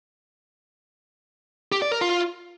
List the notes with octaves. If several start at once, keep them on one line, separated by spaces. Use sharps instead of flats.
G4
D5
A#4
F4